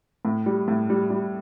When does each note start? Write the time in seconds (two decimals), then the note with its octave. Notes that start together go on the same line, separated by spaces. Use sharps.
0.25 A2
0.46 G3
0.68 A2
0.90 G3
1.10 G3